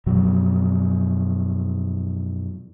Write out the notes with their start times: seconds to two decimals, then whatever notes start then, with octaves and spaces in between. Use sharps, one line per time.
0.06 F#2 B2 F3 F#3